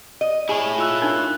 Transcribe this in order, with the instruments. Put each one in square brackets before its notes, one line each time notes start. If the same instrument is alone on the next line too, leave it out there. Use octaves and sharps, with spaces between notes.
[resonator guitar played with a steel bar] D#5
[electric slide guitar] E4 C#5 [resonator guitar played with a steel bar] G#4 [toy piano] G#5
[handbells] F4 E6 F#6
[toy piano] D4 D#4 A#4